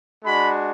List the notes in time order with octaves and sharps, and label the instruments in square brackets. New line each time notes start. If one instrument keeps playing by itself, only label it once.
[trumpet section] G#3 D4 F#4 B5